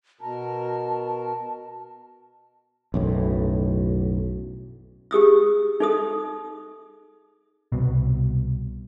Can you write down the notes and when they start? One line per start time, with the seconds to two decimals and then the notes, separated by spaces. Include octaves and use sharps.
0.21 B2 A#4 A5
2.94 B1 F#2 A2
5.11 G4 G#4 D#6 E6
5.80 D#4 A4 D#6
7.72 C2 B2